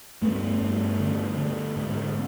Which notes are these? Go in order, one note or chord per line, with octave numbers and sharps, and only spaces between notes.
G2 A3 B3
G2
D3
D3
G#2